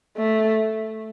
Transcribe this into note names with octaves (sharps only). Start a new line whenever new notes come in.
A3